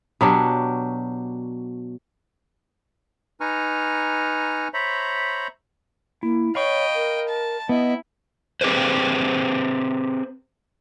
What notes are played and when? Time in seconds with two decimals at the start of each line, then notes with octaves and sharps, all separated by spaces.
0.21 B2 F#3 D4 G4
3.40 D#4 B4 G#5 A#5 C#6 F6
4.74 C5 C#5 E5 A#5 B5
6.23 A#3 E4
6.55 C#5 D#5 F5 G5 B5 C#6
6.95 A#4
7.29 A5
7.69 B3 E4 D#5
8.61 C4 G4 G#4 B4 C5